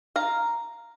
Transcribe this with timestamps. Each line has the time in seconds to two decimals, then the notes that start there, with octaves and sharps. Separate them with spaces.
0.16 F5 A#5